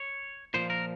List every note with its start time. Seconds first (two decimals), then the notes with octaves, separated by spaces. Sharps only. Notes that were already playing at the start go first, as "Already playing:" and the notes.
Already playing: C#5
0.54 A#2 F3 C5
0.70 A#4